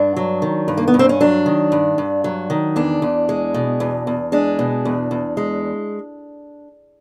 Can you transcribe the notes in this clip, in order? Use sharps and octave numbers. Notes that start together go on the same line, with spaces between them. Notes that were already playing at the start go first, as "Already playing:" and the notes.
Already playing: G2 D4
F#3
D#3
G2
A#3
B3
G2
C4
C#4
F#3 D4
D#3
G2
G2
F#3
D#3
E2 D4
E2
G#3
B2
E2
E2
G#3 D4
B2
E2
E2
G#3